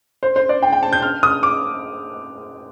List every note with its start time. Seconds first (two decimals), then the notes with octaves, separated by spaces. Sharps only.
0.23 C5
0.36 C5
0.49 D5
0.63 G5
0.73 G5
0.83 A5
0.93 G6
1.02 F6
1.23 D#6
1.43 D6